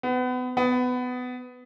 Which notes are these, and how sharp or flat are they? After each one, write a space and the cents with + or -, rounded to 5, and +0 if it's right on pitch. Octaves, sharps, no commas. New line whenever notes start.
B3 +30
B3 +20